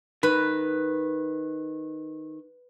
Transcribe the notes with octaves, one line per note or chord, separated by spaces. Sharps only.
D#3 B4